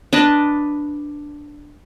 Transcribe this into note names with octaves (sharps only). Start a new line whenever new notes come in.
D4 B4 D#5 A5